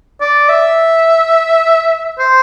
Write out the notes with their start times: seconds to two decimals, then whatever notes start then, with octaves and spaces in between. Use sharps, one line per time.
0.21 D5
0.49 E5
2.19 C5